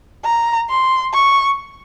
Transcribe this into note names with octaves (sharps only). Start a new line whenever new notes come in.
A#5
C6
C#6